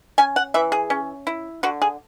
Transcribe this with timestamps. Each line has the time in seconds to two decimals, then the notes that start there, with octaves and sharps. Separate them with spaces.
0.18 C#4 G#5
0.36 F#5
0.54 E3 E5
0.72 G#4
0.90 C#4
1.27 E4
1.63 D3 F#4
1.82 G#4